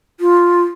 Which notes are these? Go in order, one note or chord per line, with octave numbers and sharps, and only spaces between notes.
F4